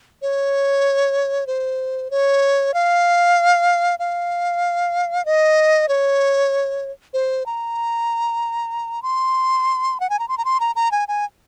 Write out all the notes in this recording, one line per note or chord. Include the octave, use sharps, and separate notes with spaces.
C#5
C5
C#5
F5
F5
D#5
C#5
C5
A#5
C6
F#5
G#5
A#5
C6
A#5
C6
A#5
A#5
G#5
G#5